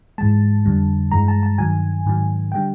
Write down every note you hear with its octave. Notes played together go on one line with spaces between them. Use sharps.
G#2 E3 G#3 A5
F2 D3 G3
G2 E3 G#3 A#5
A5
A5
G2 D#3 F#3 G#5
G#2 D#3 F#3
D3 G3 G5